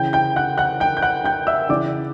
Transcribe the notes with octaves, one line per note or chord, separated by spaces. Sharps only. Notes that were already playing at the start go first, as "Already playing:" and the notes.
Already playing: C#3 E3 G5 G6
G5 G6
F#5 F#6
F#5 F#6
G5 G6
G6
F#5 F#6
G5 G6
E5 E6
C#3 E3 D5 D6